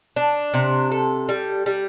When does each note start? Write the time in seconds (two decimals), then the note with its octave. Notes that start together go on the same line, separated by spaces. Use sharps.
0.16 D4
0.54 C3
0.91 A4
1.29 G3
1.66 G3